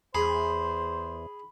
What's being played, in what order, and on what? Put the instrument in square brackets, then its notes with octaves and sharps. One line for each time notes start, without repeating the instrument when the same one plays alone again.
[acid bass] E2 [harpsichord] G#4 [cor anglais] C5 [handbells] B5